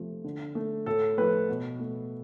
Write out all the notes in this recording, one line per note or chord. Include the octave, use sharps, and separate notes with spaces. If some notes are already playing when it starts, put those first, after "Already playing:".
Already playing: C3 F3 A3
D3
A3
A2 A4
F3 A3 B4
B2
A3